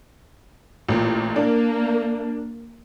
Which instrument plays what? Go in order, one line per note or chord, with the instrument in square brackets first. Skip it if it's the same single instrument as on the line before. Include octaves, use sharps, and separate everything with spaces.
[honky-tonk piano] A1 A#2
[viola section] A#3 [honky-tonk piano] D4